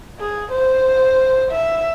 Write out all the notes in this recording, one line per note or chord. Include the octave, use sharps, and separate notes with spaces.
G#4
C5
E5